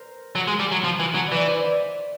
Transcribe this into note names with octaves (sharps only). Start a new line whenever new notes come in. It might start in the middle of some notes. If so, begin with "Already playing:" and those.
Already playing: A#4 C5
F#3
G#3
G3
F#3
F3
E3
F#3
E3 B4 C#5 D5
C5 D5
D5 E5